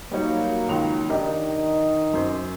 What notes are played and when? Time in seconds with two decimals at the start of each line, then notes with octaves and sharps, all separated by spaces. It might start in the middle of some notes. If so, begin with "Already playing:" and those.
0.11 F#3 G3 A#3 D#4 C#5
0.69 C#2 D#3 F7
1.10 D#3 D4 G4 A#4 D#5
2.14 F#2 C5